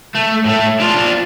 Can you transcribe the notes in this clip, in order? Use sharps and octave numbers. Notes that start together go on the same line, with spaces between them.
A3
A2 A3
D4 F4